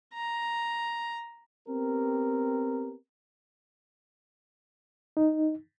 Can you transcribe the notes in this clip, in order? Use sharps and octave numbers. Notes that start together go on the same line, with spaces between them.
A#5
B3 C4 G4 A#4
D#4